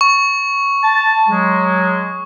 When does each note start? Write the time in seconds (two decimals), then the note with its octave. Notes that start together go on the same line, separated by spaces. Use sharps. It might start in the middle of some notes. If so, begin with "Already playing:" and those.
0.01 C#6
0.84 A5
1.28 F#3 G#3